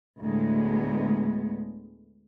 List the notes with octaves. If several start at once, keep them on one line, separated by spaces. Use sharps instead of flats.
D2 A2 G#3 B3